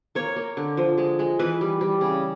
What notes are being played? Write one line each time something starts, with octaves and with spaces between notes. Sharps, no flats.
A#3 C#5
A#3
D3
F3
G#3
G#3
E3 B4
G3
G3
C#3